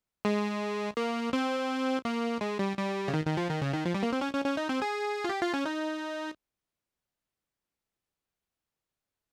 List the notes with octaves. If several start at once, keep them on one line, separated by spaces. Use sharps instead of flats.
G#3
A#3
C4
A#3
G#3
G3
G3
C#3
D#3
D#3
F3
D#3
C#3
D#3
F3
G3
A#3
C4
C#4
C#4
C#4
D#4
C4
G#4
F4
G4
F4
C#4
D#4